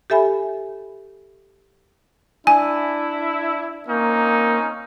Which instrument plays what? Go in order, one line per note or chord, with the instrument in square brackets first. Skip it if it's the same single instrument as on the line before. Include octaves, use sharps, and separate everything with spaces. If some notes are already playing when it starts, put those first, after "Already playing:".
[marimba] G4 A4 E5 G#5 B5
[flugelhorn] D4 [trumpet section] E4 [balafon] G#5
[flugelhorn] A#3 [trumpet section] C4 C#4 D#4